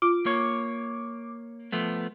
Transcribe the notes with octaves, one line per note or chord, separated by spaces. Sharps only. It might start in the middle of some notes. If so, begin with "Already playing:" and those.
F4 D6
A#3 C#5
F3 A3 B3